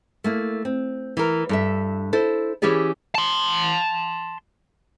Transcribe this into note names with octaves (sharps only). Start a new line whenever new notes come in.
A3 A#3 E4
C4
E3 A#4
G2 A4 E5
E4 A4 C5
E3 C#4 E4 G4 G#4 D5
A5 C6